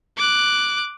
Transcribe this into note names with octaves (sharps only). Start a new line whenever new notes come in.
D6 F#6